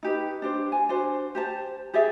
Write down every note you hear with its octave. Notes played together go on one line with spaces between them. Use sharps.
D#4 G4 B4
D4 G4 C5
G#5
D4 F#4 C5
G4 C5 A5
G4 G#4 D5 E5